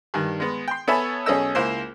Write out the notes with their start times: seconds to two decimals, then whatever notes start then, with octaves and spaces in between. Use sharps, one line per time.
0.14 G2 D#3
0.40 G#3 B3
0.68 G5 C6
0.87 B3 A4 C#5 E5 G#5 B5
1.26 B1 C#4 G#4 A4 D#5 E6
1.55 C#2 A#3 E4 C5